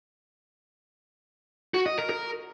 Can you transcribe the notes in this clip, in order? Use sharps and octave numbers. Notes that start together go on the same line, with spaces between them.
F#4
D#5
A#4
A#4